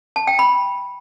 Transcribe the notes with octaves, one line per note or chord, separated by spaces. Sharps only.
A5
G5
B5